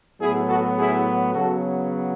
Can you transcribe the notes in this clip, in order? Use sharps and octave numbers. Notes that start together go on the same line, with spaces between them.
A2 F#3 B3 E4 G#4
F#4 A4
E4 G#4
C#3 F#3 B3 F#4 A4